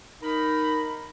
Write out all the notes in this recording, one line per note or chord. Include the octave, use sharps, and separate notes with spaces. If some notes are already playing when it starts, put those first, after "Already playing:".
D#4 A#4 B5